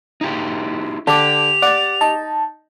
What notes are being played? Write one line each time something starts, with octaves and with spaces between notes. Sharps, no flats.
D#4 E4 G4
D3 G4 A5 D6 F7
D5 F#5 D6 A6
D#4 A5